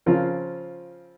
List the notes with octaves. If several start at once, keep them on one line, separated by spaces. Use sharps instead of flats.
C#3 F3 C4 F4 A#4